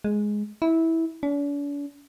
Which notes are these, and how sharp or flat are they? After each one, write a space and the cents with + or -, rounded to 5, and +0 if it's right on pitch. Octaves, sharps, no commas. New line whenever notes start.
G#3 +5
E4 -15
D4 -45